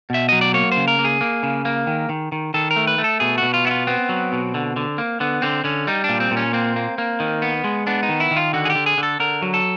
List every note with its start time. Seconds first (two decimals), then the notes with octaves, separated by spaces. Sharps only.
0.10 B2 E5
0.29 F#3 D#5
0.41 D5
0.54 A#3 C#5
0.72 C5
0.77 C#3
0.88 A#4
0.99 A#3
1.05 G#4
1.21 A#3
1.43 C#3
1.65 A#3
1.87 D#3
2.09 D#3
2.32 D#3
2.54 D#3 A4
2.71 A#4
2.76 A3
2.87 B4
2.98 A3
3.04 A4
3.20 B2 G#4
3.38 B2 F#4
3.54 F4
3.65 B3 E4
3.71 F4
3.87 B3 C4
4.09 F#3
4.32 B2
4.54 D3
4.76 D3
4.98 A#3
5.20 D3 B3
5.42 D3 C4
5.64 D3 C#4
5.87 G3 D#4
6.04 A#2 D4
6.20 C4
6.31 A#2
6.37 C#4
6.53 A#3 C4
6.76 A#3
6.98 A#3
7.20 D#3
7.42 B3
7.64 G#3
7.87 B3 D4
8.03 D#4
8.09 D#3
8.20 E4
8.31 D#3
8.36 F4
8.53 D3 F#4
8.65 G#4
8.70 G4
8.75 D3
8.86 G#4
8.98 D3
9.03 A4
9.20 D3 A#4
9.42 F#3
9.54 A4